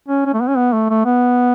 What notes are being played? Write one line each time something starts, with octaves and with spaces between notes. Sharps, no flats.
C#4
C#4
A3
B3
C#4
B3
A3
A3
B3